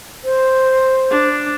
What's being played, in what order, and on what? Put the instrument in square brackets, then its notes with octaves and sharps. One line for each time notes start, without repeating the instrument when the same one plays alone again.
[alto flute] C5
[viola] D4